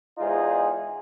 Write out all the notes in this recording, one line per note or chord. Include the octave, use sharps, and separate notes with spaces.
E2 G#2 D#4 F4 G#4